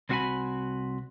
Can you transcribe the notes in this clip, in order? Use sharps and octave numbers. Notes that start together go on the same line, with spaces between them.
C2 C4 F#4 F5 G#5 B5